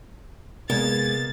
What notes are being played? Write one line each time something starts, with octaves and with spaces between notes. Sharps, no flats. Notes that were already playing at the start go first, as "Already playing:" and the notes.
C3 G#3 A#3 B3 G#6 A6